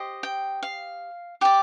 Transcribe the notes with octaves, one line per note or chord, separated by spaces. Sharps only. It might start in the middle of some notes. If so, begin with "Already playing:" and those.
Already playing: G4 C5 D#5
G5
F5
G4 D5 G5